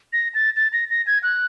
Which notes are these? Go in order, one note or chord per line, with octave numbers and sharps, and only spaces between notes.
A#6
A6
A6
A#6
A#6
G#6
F#6